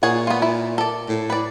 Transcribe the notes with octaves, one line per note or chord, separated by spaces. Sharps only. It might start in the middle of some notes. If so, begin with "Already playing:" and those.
A#2 G#4 C#5 F#5
B3 F4
E4
A4 D5
A2
B4 D5